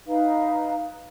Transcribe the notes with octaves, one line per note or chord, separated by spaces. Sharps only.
D#4 B4 F5